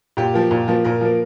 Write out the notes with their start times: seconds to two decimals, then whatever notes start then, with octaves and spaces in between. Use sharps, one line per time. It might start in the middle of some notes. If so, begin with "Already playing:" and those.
0.17 A#2 G4
0.34 F3 A#3
0.51 A#2
0.68 F3 A#3
0.84 A#2 A#4
1.01 F3 A#3